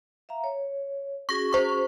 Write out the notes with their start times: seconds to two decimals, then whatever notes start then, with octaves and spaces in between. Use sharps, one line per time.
0.29 E5 F5 A#5
0.44 C#5
1.29 C#4 F#4 G#4 C#6 A#6
1.53 C5 C#6